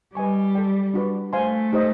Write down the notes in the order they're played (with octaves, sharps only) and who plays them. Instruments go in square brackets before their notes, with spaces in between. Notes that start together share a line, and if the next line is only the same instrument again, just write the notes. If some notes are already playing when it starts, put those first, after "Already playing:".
[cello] G3 [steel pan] B4 D#5 G#5 C#6
[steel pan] A4 D5 G5
D4 F#4 B4
[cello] A3 [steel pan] C5 F5 G#5 C6
[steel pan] D#4 G4 C5 D#5